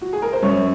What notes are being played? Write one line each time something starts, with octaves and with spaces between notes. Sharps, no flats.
F#4
G#4
A#4
C5
F#2 C#5